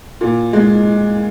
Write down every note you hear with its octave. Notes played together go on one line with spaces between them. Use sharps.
A#2
G#3